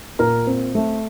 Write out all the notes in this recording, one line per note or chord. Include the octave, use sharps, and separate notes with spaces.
A#2 A#4
C4
A3